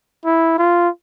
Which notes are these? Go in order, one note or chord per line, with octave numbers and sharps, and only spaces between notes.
E4
F4